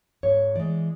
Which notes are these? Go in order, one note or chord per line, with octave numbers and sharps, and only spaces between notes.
G#2 C#5
E3 G#3 D5